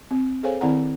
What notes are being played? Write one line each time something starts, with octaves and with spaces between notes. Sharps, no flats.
C4
G#4 A4 C5 C#5 F5 G#5
D#3 C4 E4 D5 F#5 A#5